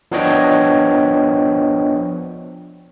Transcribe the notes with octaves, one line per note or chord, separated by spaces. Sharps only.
F3 B3 D4 C#5 D#5 G5